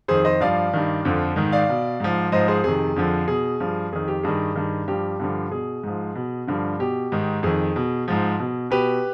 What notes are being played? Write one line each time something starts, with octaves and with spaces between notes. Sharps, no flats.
F2 D#3 G#4 C5
C5 D#5
G2 F3 D5 F5
G2 D#3
F2 D3 F3
G#2 D#3
D5 F5
B2
G#2 F3
G#2 F3 C5 D#5
G#4 C5
F2 C3 D#3 G#4
F2 D3 F3
B2 G#4
G2 F3
F2 D#3 G#4
G4
G2 D#3 G#4
G2 D#3
G2 F3 G4
G2 D3 F3
B2 G#4
G#2 F3
B2
G2 D3 F3
B2 G4
G#2 D#3
F2 D#3 G#4
B2
G#2 F3
B2
B2 G4 B4